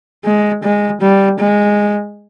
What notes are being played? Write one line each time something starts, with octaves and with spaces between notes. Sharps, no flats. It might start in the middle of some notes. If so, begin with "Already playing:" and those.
G#3
G#3
G3
G#3